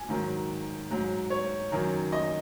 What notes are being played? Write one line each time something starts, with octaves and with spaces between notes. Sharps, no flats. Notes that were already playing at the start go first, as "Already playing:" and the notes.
Already playing: G#5
G#2 D#3 F#3
G#2 F#3
C#5
F#2 D#3 F#3
D#5